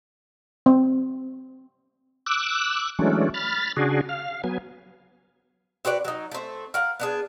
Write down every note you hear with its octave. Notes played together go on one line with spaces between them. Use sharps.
C4
D6 E6 F#6
E3 F#3 G#3 A3 C#4 D4
B5 F6 A6
C#3 D4 F#4 G#4
F5
F#3 B3 G#5
C4 F#4 B4 D5
F#3 D#4
A3 C4
A#4 F5 F#5
B3 D4 G#4